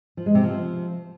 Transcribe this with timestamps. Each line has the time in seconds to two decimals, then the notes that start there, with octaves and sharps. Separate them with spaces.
0.17 F3
0.26 G#3
0.35 C3
0.44 F3